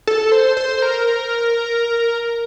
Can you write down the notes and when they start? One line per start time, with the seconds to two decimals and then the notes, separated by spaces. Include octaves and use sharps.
0.07 A4
0.32 C5
0.57 C5
0.82 A#4